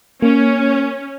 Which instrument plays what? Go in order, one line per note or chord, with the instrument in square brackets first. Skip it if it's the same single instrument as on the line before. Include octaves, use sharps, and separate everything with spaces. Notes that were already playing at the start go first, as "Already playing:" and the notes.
[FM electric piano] A#3 [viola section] C#4